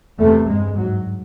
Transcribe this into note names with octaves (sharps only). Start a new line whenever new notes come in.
E2 C3 A3
G2 G#3
G#2 F#3